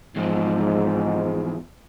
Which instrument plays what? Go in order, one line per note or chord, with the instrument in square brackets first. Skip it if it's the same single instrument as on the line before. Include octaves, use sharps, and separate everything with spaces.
[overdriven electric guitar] E2 F3 [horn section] G#2